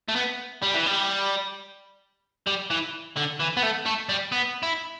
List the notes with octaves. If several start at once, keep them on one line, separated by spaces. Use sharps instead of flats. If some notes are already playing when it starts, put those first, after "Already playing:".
A3
B3
G3
E3
G3
G3
E3
D3
E3
B3
A3
A3
G3
B3
E4